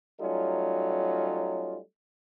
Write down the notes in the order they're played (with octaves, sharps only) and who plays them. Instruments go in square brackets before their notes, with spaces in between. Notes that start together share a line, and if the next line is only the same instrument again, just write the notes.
[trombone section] F#3 G3 A3 C#4 D#4 F4